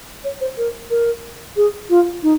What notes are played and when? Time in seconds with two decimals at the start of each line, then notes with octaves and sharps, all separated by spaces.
0.24 C#5
0.41 C5
0.58 A#4
0.90 A#4
1.56 G#4
1.90 F4
2.23 D#4